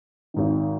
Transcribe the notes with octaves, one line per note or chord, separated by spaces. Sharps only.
G#1 G#2 D#3